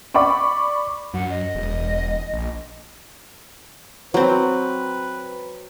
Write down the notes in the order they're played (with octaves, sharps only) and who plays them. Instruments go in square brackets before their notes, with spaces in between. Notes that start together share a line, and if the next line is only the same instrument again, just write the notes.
[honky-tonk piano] D5 B5 C#6 D6
[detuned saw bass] F#2 [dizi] F#5
[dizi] D#5
[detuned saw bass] E1
A#1
[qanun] F#3 C4 [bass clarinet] B4